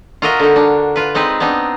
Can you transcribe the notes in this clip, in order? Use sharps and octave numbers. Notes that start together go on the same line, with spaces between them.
F4 F#4 A#4 D#5 E5
D3 D#4
D4
F4 B4
G#3 C4 D#4 B4
B3 C4 D4 D#4